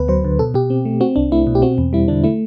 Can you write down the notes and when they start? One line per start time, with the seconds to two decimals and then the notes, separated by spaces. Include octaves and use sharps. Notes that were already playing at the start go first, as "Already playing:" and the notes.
Already playing: D2 B3 B4
0.08 F#3 C5
0.24 D3
0.39 B2 A4
0.54 B2 G4
0.70 C4
0.85 A3
1.00 C4 F#4
1.16 C2 D4
1.32 A3 E4
1.47 B2
1.55 G4
1.62 C4 F#4
1.78 E2
1.93 G3 E4
2.08 D3 D4
2.24 A3 E4